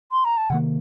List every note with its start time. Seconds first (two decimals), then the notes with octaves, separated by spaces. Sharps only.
0.12 C6
0.25 A#5
0.37 A5
0.50 C3 D#3 A#3 F#5